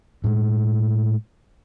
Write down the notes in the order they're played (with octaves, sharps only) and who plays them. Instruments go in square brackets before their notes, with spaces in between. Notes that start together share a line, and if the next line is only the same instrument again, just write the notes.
[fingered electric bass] A2 G#3